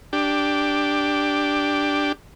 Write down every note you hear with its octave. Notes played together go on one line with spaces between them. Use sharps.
D4 G4